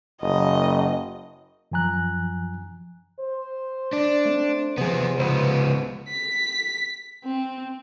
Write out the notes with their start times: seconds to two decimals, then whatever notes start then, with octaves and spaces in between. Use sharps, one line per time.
0.22 F#1 D#5
1.72 F#2 F3 G#5 A#5 F#6
3.20 C5
3.93 D4
4.25 A3 C4
4.78 C3 F3 B3 G#4
5.19 C#2 B3 C5
6.09 B6
7.25 C4